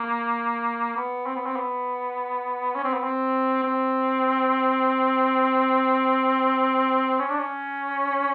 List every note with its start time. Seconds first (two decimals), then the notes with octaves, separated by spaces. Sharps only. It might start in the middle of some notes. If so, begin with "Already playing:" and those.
Already playing: A#3
0.96 B3
1.26 C4
1.36 B3
1.46 C4
1.56 B3
2.75 C#4
2.84 C4
2.93 B3
3.04 C4
3.64 C4
7.20 C#4
7.30 D4
7.39 C#4